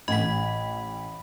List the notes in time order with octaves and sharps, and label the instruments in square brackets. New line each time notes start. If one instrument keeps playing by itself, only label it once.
[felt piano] A1 [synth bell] D#5 B6 [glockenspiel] B5